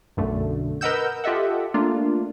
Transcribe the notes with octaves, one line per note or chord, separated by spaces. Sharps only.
B1 F#2 D3 A3
A#4 B4 D#5 F#5 E6 G6
F4 G4 A4 D#5 E5 F#5
A3 A#3 D4 F4